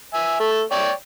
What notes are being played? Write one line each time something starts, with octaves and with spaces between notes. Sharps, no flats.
E5 G#5
A3 A4
C#5 D5 G5